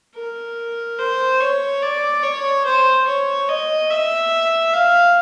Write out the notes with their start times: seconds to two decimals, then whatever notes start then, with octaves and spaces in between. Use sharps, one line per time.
0.15 A#4
0.99 C5
1.41 C#5
1.82 D5
2.23 C#5
2.65 C5
3.07 C#5
3.49 D#5
3.90 E5
4.73 F5